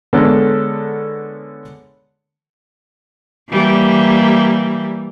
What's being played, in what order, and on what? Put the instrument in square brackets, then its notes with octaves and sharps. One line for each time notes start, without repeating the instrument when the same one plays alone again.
[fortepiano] D3 G#3 B3 C#4 A4 A#4
[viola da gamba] E3 G3 A#3